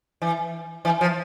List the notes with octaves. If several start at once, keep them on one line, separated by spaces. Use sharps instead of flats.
E3
E3
F3